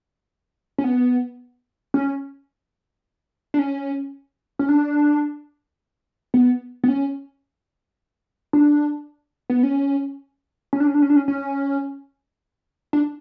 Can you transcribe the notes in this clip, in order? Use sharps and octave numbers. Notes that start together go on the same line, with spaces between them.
C#4
B3
C#4
D4
C#4
C#4
D4
B3
B3
C#4
D4
B3
C#4
C#4
D4
C#4
D4
C#4
D4
C#4
C#4
D4